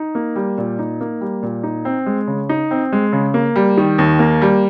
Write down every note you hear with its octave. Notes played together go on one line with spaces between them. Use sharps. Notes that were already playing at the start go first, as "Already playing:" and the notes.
Already playing: D#4
A#3
G3
A#2
D#4
A#3
G3
A#2
D#4
C4
G#3
C#3
D#4
C4
G#3
C#3
A#3
G3
D#3
D#2
A#3
G3